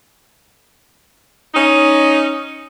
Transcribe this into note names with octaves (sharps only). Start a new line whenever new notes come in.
C#4 D#4